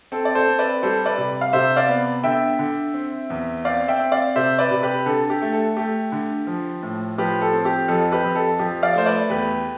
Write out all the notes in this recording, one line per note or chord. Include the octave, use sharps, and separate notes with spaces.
C4 A4
D5
A4 C5
C4
B4 D5
G3 A4 C5
B4 D5
C3
F5
C3 C5 E5
D5 F5
B3
D3 E5 G5
D3
C4
E2
C4 D5 F5
E5 G5
C4
D5 F5
C3 C5 E5
B4 D5
C3
G4 B4
D3 A4
G4
A3
A4
A3 G4
D3
F3
A2
F3 G4 B4
A4
C4
G4
F2 A4
G4 B4
F2
A4
F3 G4
D5 F5
A3 C5
B4 D5
E2 G4 B4